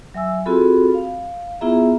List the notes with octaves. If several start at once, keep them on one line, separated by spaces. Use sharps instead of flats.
F#3 E5 G#5 E6
C4 F4 F#4 G#4 A4 B5
F5
B3 E4 F4 G#4 E5 A#5